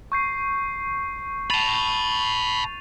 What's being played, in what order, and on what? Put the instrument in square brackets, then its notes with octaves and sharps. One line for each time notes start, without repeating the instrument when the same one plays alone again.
[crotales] C#6 G6 C7
[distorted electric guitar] A5 B5 [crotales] A6 D#7 F7